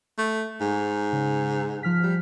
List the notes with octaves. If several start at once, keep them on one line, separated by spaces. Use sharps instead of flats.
A3
G#2
C#3
F3 F6 B6
G3